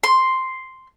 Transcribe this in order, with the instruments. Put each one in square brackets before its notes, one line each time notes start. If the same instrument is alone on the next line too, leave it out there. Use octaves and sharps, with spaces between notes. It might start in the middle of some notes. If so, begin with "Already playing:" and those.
[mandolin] C6